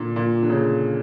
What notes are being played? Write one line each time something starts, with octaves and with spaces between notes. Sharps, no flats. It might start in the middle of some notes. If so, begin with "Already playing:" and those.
Already playing: A#2 D3
A#2
D3
C#3